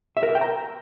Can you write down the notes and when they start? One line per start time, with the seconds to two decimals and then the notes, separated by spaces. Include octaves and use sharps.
0.17 E5
0.23 A#4
0.29 E5
0.35 G5
0.41 A#5